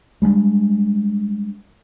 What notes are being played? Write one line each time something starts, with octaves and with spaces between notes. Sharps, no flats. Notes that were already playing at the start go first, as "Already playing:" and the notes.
G3 G#3 B3 D4